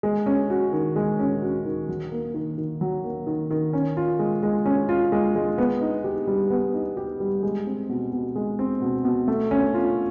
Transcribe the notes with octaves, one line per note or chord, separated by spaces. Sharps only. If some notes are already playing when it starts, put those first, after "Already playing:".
G#3
C#4
F#4
D#3
G#3
C#4
F#4
D#3
F#3
A#3
D#3
D#3
F#3
A#3
D#3
D#3
C#4
F4
G#3
G#3
C#4
F4
G#3
G#3
B3
D#4
G4
G3
B3
D#4
G4
G3
G#3
C4
B2
B2
G#3
C4
B2
B2
A3
C#4
F4